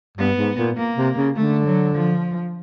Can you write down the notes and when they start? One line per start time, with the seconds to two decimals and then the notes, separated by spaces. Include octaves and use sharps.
0.18 G2 B3
0.37 G#2
0.57 A#2
0.77 A#3
0.97 C3
1.16 C#3
1.36 D3 A3
1.65 F#3
1.95 F3